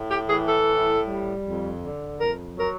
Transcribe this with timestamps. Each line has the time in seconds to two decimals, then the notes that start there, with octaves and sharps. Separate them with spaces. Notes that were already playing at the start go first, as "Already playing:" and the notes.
Already playing: A2
0.10 G4
0.28 E3 G#4
0.48 A4
0.67 A2
1.05 G3
1.43 F2
1.81 D3
2.19 F2 A#4
2.57 F#3 A#4